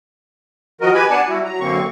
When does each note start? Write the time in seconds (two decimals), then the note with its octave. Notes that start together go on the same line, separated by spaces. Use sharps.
0.81 D#3 F3 F#4 A#4 D#5
0.94 G4 B4 G#5 B5
1.10 B3 D4 D5 F#5 G#5 A5
1.28 G3 E4 F#4
1.44 F#3 A#5
1.60 F#2 D3 A#3 C4 C#6